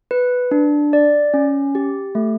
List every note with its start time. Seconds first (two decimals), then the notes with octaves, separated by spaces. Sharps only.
0.11 B4
0.51 D4
0.93 D5
1.34 C#4
1.75 G4
2.15 A3